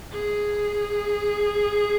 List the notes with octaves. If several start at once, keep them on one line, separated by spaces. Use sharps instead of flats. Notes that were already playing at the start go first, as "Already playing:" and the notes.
G#4